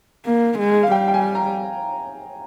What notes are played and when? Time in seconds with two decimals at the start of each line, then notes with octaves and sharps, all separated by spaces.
0.26 A#3
0.59 G#3
0.83 F5
0.92 G3 G5
1.08 G5
1.14 G#5
1.35 A#5